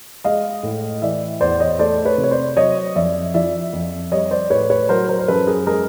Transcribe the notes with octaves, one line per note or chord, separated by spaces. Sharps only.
G#3 D#5 F5
A2
E3 D5 E5
E2 C5 D5
C#5 D#5
A3 C5 D5
B4 C#5
C3
C#5
C5 D5
F#3 C#5 D#5
F2 D5 E5
F3 D5 E5
F2
G3 C#5 D#5
C5 D5
A2 B4 C#5
B4 C#5
F#3 A#4 C5
A#4 C5
C5
F#2 A4 B4
G#4 A#4
G#3 G#4 A#4